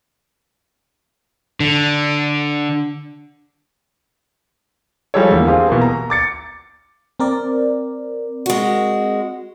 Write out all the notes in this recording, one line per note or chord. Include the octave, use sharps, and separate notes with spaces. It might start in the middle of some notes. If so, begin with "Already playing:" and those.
D3
F3 G3 G#3 G4 A4 C#5
E2 D3 A#3
C4 F4 G4 G#4
B2 E3 A#3
A#5
D6 A6 C#7
C4 A#4 D5
G#3 F#4